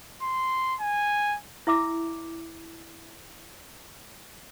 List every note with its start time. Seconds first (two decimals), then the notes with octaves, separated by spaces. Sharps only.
0.22 C6
0.81 G#5
1.67 E4 E5 D6 E6